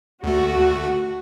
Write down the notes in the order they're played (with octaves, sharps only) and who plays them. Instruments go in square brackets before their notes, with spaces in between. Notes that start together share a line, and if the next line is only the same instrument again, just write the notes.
[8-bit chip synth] D2 A3 [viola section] F#4